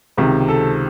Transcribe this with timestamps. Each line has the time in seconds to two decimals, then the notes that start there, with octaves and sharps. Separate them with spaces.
0.17 C#2 C3 D#3
0.48 A4